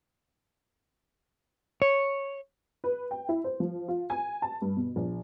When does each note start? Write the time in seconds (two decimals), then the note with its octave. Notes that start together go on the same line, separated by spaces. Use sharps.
1.82 C#5
2.84 B4
3.11 G5
3.29 E4
3.44 C5
3.60 F3
3.88 F4
4.10 G#5
4.42 A5
4.62 G2
4.76 B2
4.96 A#1